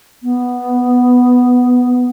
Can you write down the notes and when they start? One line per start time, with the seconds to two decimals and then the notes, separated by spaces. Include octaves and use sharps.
0.23 B3